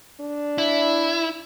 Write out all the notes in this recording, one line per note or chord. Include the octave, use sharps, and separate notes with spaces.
D4
E4